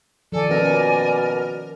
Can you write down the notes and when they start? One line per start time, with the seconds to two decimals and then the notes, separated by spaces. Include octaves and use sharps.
0.32 D#3 F3 A4 D5 G#5
0.50 B2 F3 A#3 C#4 A#4